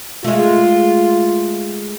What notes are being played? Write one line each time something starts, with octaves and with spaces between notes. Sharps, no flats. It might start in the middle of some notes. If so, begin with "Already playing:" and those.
G#3 A3 F4